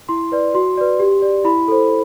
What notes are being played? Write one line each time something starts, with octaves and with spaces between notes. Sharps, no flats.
E4 C6
B4 D5
F#4 C6
B4 D5
G4
D5
E4 B5
A4 C5